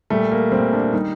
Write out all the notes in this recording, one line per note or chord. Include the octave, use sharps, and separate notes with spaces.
A#2 G3 A3
A#3
A#2 G3 C4
D4
D#3 G3 D#4